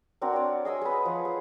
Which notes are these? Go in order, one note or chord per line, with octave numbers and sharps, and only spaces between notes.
C4 D4 F#4 A#4
C#5 D5
G#4 D#5 G#5 E6
G#4 B4
F3 C#5
G#4